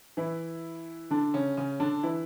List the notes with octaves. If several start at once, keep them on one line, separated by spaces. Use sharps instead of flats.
E3 E4
D3 D4
C#3 C#4
C#3 C#4
D3 D4
E3 E4